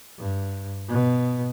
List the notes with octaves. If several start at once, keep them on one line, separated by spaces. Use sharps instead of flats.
G2
B2